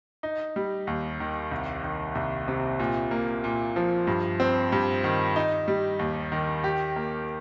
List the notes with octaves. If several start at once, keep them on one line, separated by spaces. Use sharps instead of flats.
D#4
G3
D#2
D#3
C2
D#3
C2
C3
A#2
A#3
A#2
F3
G2
C4
G2
D#3
D#4
G3
D#2
D#3
G4
A#3